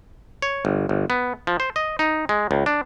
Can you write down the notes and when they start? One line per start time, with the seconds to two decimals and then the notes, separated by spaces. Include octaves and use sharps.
0.42 C#5
0.65 G1
0.89 G1
1.10 B3
1.47 F3
1.60 C5
1.76 D#5
1.99 D#4
2.29 G#3
2.51 C#2
2.66 D4